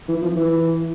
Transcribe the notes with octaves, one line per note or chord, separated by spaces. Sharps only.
E3
F3
E3